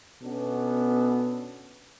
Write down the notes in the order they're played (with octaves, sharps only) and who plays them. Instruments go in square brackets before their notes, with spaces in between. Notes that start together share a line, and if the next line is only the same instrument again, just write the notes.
[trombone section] B2 B3 C#4 D4 A4